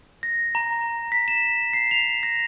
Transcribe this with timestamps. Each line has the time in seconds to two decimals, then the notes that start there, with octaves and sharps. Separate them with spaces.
0.23 A#6
0.55 A#5
1.12 B6
1.28 E7
1.73 C7
1.91 F7
2.23 A#6